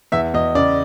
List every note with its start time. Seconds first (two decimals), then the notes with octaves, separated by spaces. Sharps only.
0.12 E2 E5
0.34 E2 D#5
0.55 C#3 D5